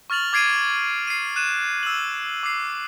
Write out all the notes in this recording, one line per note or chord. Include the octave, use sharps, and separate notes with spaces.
C#6 F6 A6 F7 F#7
D6 G#6 C7 D7 D#7
C7 D#7
F#6 D#7 E7
E6 F#7
D6 C7